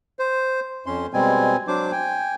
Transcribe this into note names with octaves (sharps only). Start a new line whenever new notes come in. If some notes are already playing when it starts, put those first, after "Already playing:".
C5
F2 C#4 C6
B2 G3 G#3 C4 G#5
F#3 D4 C5 D6
G5 G#5